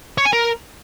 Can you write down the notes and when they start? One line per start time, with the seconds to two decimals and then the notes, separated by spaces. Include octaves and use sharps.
0.18 C#5
0.25 G#5
0.33 A#4